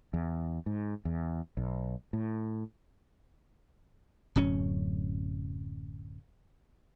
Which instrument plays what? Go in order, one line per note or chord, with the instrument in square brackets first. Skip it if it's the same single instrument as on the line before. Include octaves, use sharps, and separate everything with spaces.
[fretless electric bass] E2
G#2
E2
B1
A2
[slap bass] D1 F#2 C#4